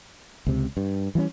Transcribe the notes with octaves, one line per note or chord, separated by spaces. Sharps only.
C#2 C3
G2
E3 G3 A#3 C#4